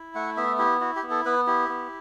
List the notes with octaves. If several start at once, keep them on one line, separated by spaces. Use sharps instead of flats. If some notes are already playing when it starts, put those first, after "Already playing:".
Already playing: E4
A3 F#5
B3 E5
E4 G4
E4 F#4
G4
B3
A4
B3 B4
E4 G4
B3